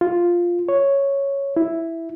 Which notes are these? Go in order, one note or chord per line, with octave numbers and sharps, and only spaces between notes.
F4
C#5
E4